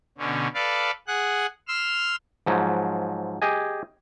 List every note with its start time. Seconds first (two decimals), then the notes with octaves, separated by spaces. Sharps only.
0.18 B2 D3 C#4
0.54 A4 B4 D5 F5
1.07 G#4 F#5 F#6
1.68 C6 E6 F6
2.46 G#2 F3 F#3
3.42 G4 G#4 D#5 G#5